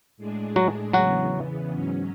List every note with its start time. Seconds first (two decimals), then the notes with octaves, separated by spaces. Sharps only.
0.17 A2 G#3 D4 G#4
0.56 F#3 F#4
0.93 E2 C#3 E3 F#3 B3 F#4
1.71 G#2 F#3 C#4